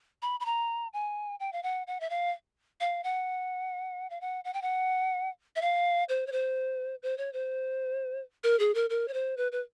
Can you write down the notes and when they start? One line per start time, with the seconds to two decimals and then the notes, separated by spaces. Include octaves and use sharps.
0.22 B5
0.40 B5
0.46 A#5
0.93 G#5
1.40 G5
1.53 F5
1.63 F#5
1.87 F#5
2.00 E5
2.10 F5
2.80 F5
3.04 F#5
4.10 F5
4.21 F#5
4.44 F#5
4.54 G5
4.62 F#5
5.56 E5
5.62 F5
6.09 C5
6.27 C#5
6.32 C5
7.03 C5
7.18 C#5
7.33 C5
8.44 A#4
8.59 G#4
8.75 A#4
8.90 A#4
9.08 C#5
9.13 C5
9.37 B4
9.52 B4